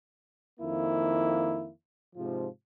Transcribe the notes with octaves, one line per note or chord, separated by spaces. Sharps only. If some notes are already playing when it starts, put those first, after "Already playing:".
F2 D#3 A#3 E4
G#2 C3 F3